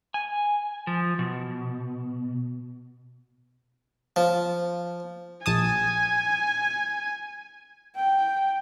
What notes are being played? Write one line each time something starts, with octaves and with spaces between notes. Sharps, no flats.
G#5
F3
B2
F3
A#1 G#5 A5 D#6
G5